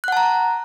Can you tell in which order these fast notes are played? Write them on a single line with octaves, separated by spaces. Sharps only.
F#6 F#5 A5 A#5